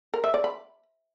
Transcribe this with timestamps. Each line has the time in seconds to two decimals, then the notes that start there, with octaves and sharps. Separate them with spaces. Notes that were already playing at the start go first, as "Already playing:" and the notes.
0.14 A#4
0.24 E5
0.34 D5
0.44 B5